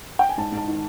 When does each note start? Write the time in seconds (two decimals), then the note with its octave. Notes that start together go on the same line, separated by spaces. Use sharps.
0.19 G5
0.29 G#5
0.38 G#2 A5
0.52 G#2
0.57 A5
0.68 D#3